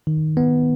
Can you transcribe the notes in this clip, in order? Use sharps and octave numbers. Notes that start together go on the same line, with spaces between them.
D#3
B3